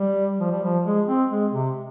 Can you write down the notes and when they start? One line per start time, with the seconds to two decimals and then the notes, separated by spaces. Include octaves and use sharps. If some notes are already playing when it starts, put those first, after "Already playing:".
Already playing: G3
0.40 F3
0.51 G3
0.64 F3
0.84 G#3
1.07 C4
1.30 G#3
1.53 C3